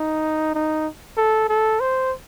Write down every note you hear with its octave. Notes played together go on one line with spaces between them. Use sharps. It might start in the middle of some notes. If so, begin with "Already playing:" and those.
Already playing: D#4
D#4
A4
A4
C5